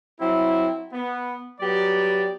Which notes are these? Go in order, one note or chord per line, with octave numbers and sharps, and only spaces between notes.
F#3 C4 E4
B3
F#3 B3 G4 D5